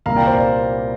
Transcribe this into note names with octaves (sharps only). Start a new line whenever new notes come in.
C2 A#2 G3 A#3 F5 A#5
D5 G5
C5 F5
D5